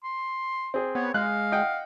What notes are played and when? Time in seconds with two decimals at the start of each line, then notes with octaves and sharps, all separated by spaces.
0.04 C6
0.74 C4 G#4
0.95 B3 C#5
1.14 G#3 F5 F#6
1.52 D#5 F#5 G5